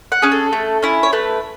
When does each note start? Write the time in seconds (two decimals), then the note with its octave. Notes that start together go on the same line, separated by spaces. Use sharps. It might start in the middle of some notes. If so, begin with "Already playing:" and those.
0.12 F#5
0.22 C#4 G#4
0.32 A4
0.52 A3
0.82 C#4 E4
1.03 C#5
1.13 A3 B4